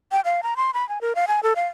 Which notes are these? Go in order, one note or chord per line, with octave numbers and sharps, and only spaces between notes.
G5
F5
A#5
C6
B5
G#5
A#4
F5
G#5
A4
F5